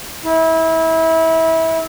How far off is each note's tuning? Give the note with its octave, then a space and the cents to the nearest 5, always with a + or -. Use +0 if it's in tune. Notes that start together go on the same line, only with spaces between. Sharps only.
E4 -25